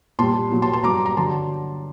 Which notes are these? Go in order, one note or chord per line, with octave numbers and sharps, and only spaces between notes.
A#2 G3 A5 C6
A#2 F#3
A5 C6
A5 C6
G2 F#3 A#5 D6
A#5
D3 F#3 A5 C6